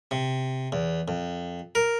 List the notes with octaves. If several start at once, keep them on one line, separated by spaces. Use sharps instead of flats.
C3
E2
F2
A#4